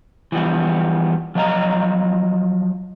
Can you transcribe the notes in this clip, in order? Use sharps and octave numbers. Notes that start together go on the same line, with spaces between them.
E3 F3 G3 B3
F3 F#3 D#5 F5 G5 A#5